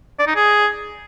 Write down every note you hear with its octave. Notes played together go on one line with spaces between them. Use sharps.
D5
D#4
G#4